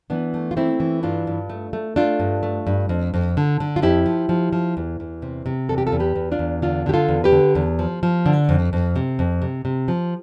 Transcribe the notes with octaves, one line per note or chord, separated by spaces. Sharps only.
E3 B3 D4
A3
F4
A3 C4 E4
E3
G2 D4 F4
G2
A3
A3
A3 D4 F4
G2
A3
G2
F2
F2
D3
D3
F4
F2 E4 G4
F3
F3
F3
E2
E2
C3
C3
E2 A4
G4
F4 A4
E2
G4 B4
E2
D4 F4
E2
D3 D4 F4
D3 G4
F4 A4
E2
G4 B4
D3
E2
F3
F3
D3
F2
F2
C3
F2
C3
C3
F3